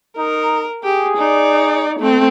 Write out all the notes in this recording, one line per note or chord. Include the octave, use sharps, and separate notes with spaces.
D#4 A#4
G4 G#4
D#4 D5
A3 C4